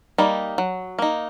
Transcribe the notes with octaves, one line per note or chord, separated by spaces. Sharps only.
G3 A#3 D#4
F#3
A#3 D#4